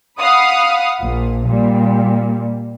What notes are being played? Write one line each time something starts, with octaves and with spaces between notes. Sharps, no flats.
F5 F#5 B5 D#6
A#1 A#2
A#2 G3